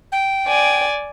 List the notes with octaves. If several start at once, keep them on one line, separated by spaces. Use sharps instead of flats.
G5
D5 G#5